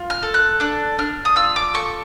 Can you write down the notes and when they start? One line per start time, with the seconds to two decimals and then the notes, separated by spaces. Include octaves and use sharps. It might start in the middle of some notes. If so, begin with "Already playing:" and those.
Already playing: F4
0.10 F6
0.22 A4
0.34 F#6
0.60 D4 F#6
0.98 D4 F6
1.25 D#6
1.36 F4 E6
1.56 D6
1.74 A4 C#6